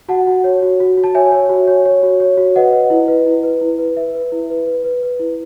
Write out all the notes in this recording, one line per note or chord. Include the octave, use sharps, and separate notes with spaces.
F#4 F#5 A5
F#4
C#5
F#4
F#4
F#4
A5
C#5 E5 G#5
C#5
F#4
C#5
C#5
F#4
C#5
F#4
B4 D#5 F#5
B4
E4
B4
E4
B4
E4
B4
B4 E5
B4
E4
B4
B4
B4
B4
E4